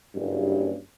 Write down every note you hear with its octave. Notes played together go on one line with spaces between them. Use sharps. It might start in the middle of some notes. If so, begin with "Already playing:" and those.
F#1 G2